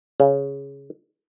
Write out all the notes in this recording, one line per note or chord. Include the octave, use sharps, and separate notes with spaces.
C#3